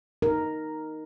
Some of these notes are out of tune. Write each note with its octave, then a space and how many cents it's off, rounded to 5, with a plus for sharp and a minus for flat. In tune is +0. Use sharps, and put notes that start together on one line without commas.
D#4 +0 A#4 +0